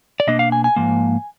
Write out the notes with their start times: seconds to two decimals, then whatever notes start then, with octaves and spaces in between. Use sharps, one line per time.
0.20 D5
0.27 B2 A#3 D4 D#5
0.39 F5
0.52 G#5
0.64 G#5
0.76 G#2 F3 A#3